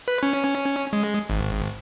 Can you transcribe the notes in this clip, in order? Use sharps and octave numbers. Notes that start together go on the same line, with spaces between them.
B4
C#4
G#3
G#1